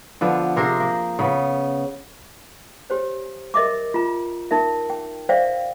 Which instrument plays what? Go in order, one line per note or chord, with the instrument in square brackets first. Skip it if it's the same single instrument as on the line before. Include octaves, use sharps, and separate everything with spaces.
[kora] D3 F3 B3
C3 G#4 A#4 C5
A#3
C#3 B3
[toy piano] G4 C5 C#5
A#4 D#5 E5 D6
F4 A#5
D#4 A#4 E5
G5
C5 D5 E5 F5 G5